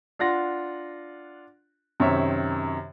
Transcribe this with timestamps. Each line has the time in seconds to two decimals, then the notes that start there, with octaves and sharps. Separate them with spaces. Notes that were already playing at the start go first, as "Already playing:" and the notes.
0.19 D4 F4 F#5 A#6
2.00 F#2 C3 D#3 C5 C#5 E5